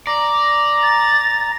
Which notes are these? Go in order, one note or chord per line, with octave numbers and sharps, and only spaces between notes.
D5 A#5
A6